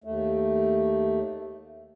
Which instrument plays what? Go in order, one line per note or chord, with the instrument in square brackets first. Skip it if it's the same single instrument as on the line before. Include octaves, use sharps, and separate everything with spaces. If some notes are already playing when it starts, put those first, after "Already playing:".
[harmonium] D#2 A3